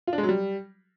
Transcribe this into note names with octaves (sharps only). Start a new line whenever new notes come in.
F4
D4
G#3
F#3
G3